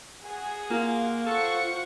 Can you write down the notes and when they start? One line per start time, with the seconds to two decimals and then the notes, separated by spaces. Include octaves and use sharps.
0.21 F#4 G#4
0.71 A#3 F4
1.27 A4 C5 F#5 C#6